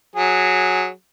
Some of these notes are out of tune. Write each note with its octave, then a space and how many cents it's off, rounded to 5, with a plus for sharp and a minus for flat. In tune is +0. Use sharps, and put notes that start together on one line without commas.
F#3 -10 G#4 +0